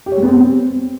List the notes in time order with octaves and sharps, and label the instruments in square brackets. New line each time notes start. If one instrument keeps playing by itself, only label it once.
[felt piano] G4
C#5
G#3
B3
C4